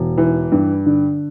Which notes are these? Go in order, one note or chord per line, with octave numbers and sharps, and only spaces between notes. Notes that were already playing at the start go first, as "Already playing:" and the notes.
Already playing: E1
E3
G2
D3